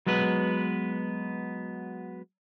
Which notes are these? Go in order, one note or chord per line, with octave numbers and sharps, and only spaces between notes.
F#3 G#3 B3 B4